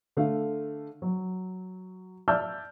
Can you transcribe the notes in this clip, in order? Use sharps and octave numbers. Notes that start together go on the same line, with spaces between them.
D3 A3 F5
F#3
D5 E5 A5 E6 F6 G6